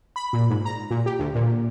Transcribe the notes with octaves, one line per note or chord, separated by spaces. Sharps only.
B5
A#2
G#2
A#5
A#2
G4
D2
A#2